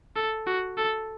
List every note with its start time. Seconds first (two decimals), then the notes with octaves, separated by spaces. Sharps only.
0.16 A4
0.47 F#4
0.78 A4